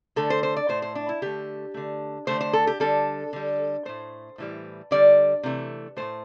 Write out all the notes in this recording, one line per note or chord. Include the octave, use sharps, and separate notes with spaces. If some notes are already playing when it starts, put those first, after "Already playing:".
D3 A3 A4
C5
C5
D5
A2 A3 C5
C5
D4
E4
D3 A3 G4
D3 A3
D3 A3 C5
C5
A4
G4
D3 G3 A4
D3 G3
A2 A3 C5
A2 E3 G3
D3 G3 D5
C3 E3 A3
E3 A3 C5
A2